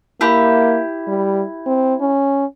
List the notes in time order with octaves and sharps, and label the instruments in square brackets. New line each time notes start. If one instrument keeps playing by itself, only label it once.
[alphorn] A#3 [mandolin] E4 G4
[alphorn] G3
C4
C#4